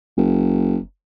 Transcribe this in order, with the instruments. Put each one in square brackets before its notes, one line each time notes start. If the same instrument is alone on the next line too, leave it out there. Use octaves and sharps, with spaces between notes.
[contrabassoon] F#1